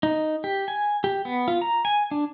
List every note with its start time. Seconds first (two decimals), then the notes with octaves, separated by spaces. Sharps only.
0.03 D#4
0.44 G4
0.68 G#5
1.04 G4
1.25 B3
1.48 F4
1.62 A#5
1.85 G#5
2.11 D4